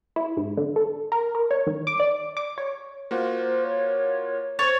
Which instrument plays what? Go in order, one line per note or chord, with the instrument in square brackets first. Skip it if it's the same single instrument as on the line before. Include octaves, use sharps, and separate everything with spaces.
[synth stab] E4
G#2
D3
A4
A#4
A#4
C#5
D#3
D6
D5
D6
C#5
[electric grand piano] A#3 F4 F#4 [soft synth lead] C5
[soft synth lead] C#5
[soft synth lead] C5 [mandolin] C#5 [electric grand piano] A6